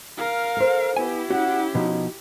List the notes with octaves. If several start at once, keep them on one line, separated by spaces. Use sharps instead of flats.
A#4 F5
A4 C5
B3 E4 G4 G#5
C#4 F#4 F#5
B2 F3 D#4